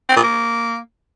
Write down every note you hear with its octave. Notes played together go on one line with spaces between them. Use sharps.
C4
A#2
A#3